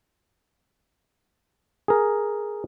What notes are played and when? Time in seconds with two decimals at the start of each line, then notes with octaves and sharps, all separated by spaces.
1.88 G#4 A#4